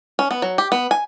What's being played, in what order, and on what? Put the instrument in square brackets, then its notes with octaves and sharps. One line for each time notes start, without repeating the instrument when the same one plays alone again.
[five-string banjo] C#4
B3
F#3
G4
B3
G#5